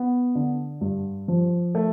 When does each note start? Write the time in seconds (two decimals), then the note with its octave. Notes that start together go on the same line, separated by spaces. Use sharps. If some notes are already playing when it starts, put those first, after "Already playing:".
Already playing: B3
0.35 D3
0.81 G2
1.28 F3
1.75 A3